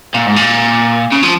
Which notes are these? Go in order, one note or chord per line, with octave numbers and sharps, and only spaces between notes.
A#2
G#2
A#2
C#3
F3